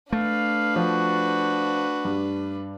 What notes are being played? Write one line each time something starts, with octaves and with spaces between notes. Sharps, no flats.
A3 D4 B4 F5
F3 F#4
G2